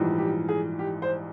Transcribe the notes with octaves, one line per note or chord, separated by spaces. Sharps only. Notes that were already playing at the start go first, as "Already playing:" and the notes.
Already playing: A#1 G#2 E3 G3
G4
G#4
G4
C5